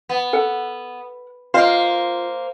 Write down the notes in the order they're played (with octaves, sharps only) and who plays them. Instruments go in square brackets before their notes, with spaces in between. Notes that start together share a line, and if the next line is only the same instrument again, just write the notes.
[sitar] B3
[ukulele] A4 F#5
[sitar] A#3 C5 [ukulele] F4 D#5 F5